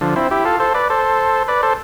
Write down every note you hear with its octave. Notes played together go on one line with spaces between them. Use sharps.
D3 F3
C4 E4
E4 G4
F4 A4
A4 C5
B4 D5
A4 C5
B4 D5
A4 C5